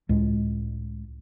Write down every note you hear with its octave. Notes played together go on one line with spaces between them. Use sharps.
C#2 A2 G#3